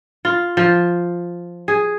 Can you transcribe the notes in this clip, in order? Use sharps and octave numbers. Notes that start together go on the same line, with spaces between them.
F4
F3
G#4